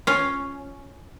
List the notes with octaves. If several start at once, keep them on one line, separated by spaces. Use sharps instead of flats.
C#4 F4